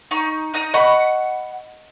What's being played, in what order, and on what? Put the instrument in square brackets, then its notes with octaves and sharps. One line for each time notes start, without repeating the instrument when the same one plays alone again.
[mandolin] D#4 C#6
D#4 D#5
[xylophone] D#5 [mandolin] F#5 B5 C#6